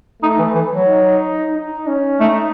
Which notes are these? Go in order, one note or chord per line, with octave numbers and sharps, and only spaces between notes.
A3 D#4
E3
E3
F#3
D#4
D#4
C#4
A3 D#4